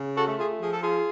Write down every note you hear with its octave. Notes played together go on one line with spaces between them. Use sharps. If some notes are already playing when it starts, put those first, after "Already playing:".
Already playing: C#3
F#4 A4
A3
F4 G#4
F3 G#4
A4
F4 G#4